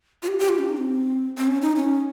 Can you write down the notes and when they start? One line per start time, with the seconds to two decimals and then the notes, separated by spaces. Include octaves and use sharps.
0.23 F4
0.28 G4
0.39 G4
0.49 F4
0.59 C#4
0.69 D#4
0.78 C4
1.38 C4
1.48 C#4
1.62 D#4
1.76 C#4